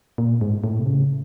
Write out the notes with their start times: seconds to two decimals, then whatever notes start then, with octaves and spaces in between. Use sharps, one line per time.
0.18 A#2
0.41 G#2
0.64 A2
0.79 C3
0.87 C#3